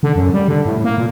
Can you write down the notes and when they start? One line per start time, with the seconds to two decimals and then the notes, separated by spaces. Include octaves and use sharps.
0.03 D3
0.16 F#2
0.33 G3
0.48 D3
0.66 A2
0.84 A#3
0.98 A#2